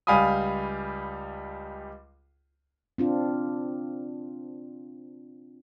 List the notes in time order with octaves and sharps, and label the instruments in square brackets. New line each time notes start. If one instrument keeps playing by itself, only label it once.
[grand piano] C#2 G3 F5 G#5 B5 D#6
[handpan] C4 D4 F4